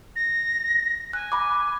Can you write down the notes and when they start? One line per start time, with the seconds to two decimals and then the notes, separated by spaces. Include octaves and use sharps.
0.16 A#6
1.13 G#5 F#6
1.32 B5 D6